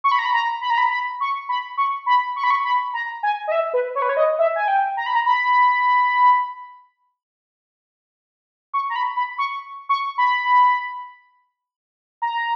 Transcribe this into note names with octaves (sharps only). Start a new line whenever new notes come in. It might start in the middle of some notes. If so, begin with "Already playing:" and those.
C#6
B5
A#5
B5
A#5
B5
A#5
B5
B5
C#6
B5
C#6
B5
C#6
B5
C#6
B5
A#5
G#5
D#5
E5
B4
C#5
B4
C#5
D#5
E5
G#5
G5
A#5
B5
A#5
B5
C#6
A#5
B5
B5
C#6
C#6
B5
A#5